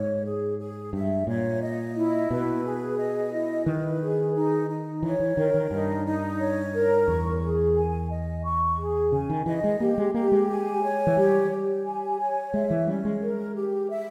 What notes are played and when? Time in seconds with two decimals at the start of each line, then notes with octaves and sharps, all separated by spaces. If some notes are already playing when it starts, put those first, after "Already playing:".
Already playing: G#2 C#5
0.25 G#4
0.59 G#4
0.93 G2 E5
1.27 A#2 C#5
1.61 D#5
1.96 E4
2.30 B2 B4
2.64 G#4
2.98 D#5
3.33 E4
3.66 D#3 B4
4.01 G#4
4.34 D#4
4.69 D#4
5.03 E3 C#5
5.20 E3
5.37 D#3 A#4
5.54 D#3
5.71 G2 D#4
6.06 D#4
6.39 C#5
6.74 A#4
7.07 E2 C#6
7.42 G#4
7.75 G#5
8.10 D#5
8.44 C#6
8.78 G#4
9.12 C#3 G#5
9.29 D#3
9.46 E3 D#5
9.64 G#3
9.80 A#3 G4
9.98 G#3
10.14 A#3 G4
10.32 G#3
10.49 G#5
10.83 C#5
11.07 E3
11.17 G3 G4
11.50 G4
11.85 G#5
12.19 C#5
12.53 G#3 E5
12.70 E3
12.87 G3 C#4
13.05 G#3
13.21 A#4
13.55 G4
13.90 E5